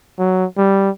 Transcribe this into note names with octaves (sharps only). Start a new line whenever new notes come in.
F#3
G3